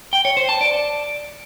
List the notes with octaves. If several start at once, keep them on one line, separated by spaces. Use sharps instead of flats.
G5
C#5
C5
A5
D5